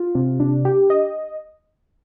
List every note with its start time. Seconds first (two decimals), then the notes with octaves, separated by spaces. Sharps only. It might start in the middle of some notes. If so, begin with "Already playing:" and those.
Already playing: F4
0.15 C3
0.40 D4
0.65 G4
0.90 D#5